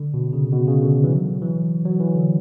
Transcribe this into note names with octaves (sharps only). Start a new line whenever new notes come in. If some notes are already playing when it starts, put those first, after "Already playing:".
Already playing: D3
B2
C#3
B2
C#3
D3
E3
F#3
E3
F#3
E3
D3